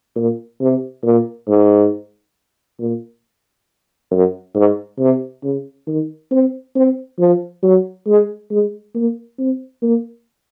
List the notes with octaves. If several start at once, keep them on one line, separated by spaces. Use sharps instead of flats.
A#2
C3
A#2
G#2
A#2
F#2
G#2
C3
C#3
D#3
C4
C4
F3
F#3
G#3
G#3
A#3
C4
A#3